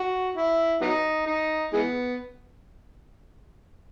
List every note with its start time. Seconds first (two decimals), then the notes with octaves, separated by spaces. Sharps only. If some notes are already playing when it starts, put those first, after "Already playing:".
Already playing: F#4
0.35 E4
0.81 F#3 B3 D#4
1.26 D#4
1.73 E3 G#3 B3